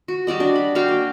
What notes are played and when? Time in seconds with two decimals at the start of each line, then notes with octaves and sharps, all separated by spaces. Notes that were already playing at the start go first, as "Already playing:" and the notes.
0.08 F#4
0.27 G3 F#4 D5 D#5
0.40 D4
0.56 B5
0.75 F#4 F5 G5
0.88 A#3